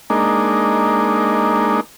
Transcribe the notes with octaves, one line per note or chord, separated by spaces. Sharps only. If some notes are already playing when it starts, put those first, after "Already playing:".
G#3 A#3 D4 D#4